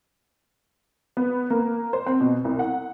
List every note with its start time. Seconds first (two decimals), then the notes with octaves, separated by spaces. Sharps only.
1.17 B3
1.50 A#3
1.93 C5
2.06 C4
2.21 B2
2.45 C2
2.59 F#5